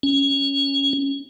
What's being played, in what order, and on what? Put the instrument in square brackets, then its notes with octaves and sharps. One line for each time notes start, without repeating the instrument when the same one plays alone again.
[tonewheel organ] C#4